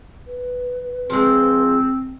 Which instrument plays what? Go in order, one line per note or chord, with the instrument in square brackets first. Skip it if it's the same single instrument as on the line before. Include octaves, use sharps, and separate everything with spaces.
[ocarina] B4
[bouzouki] F3 G#3 [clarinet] C4